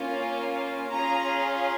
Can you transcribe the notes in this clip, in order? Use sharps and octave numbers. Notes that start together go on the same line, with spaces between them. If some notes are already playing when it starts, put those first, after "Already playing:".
Already playing: A#3 C#4 F4
C#4 F4 G#4 A#5